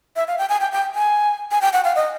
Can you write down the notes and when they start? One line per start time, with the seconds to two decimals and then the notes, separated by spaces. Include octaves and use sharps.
0.16 E5
0.28 F5
0.38 G5
0.49 G#5
0.60 G5
0.72 G5
0.95 G#5
1.51 G#5
1.61 G5
1.73 F#5
1.84 F5
1.96 D#5